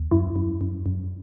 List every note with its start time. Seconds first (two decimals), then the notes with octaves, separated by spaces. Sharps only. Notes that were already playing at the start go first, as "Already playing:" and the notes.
Already playing: D#2
0.11 F#2 E4
0.36 F#2
0.61 F#2
0.86 F#2